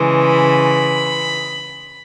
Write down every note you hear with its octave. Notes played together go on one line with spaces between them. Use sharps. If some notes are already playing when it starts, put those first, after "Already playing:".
Already playing: C#3 E3 G#3
B5